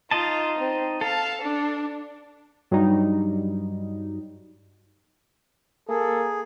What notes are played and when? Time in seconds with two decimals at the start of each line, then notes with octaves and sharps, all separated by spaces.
0.11 D#4 F4 D#5 A5
0.59 C4
1.01 A4 F5 A5
1.42 D4
2.71 G2 F#3 G3 D#4
5.89 A#3 G#4 A4